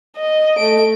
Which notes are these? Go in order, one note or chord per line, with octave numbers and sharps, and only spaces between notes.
D#5
A3 D7